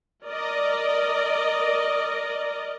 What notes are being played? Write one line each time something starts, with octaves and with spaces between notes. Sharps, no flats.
A#4 D5 D#5